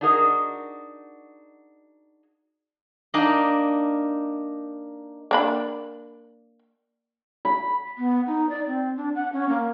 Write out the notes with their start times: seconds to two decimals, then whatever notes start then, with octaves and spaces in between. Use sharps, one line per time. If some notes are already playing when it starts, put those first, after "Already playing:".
0.01 D4 D#4 F#4 G#4 A#4 D#5
3.14 A#3 D4 D#4 D#5
5.31 A#3 D4 B5
7.45 B5
7.98 B3
8.27 D#4
8.50 D5
8.67 C4
8.97 D4
9.15 F#5
9.33 C#4
9.49 A#3